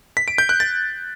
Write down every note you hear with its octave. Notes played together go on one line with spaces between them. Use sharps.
B6
D7
G6
F#6
A6